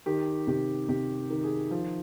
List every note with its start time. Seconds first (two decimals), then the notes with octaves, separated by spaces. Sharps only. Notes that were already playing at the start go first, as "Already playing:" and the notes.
0.06 D#3 G4
0.47 C3 G4
0.88 C3 G4
1.30 D#3
1.44 G#4
1.71 F3